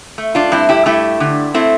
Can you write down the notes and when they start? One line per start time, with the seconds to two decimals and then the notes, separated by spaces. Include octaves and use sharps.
0.18 A3
0.35 D4 F4
0.52 G2 C4 E4
0.69 E4 G4
0.86 A3 E4 G4
1.20 D3
1.54 A3 C4 E4